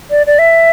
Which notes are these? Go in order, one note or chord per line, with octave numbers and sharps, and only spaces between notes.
D5
D5
E5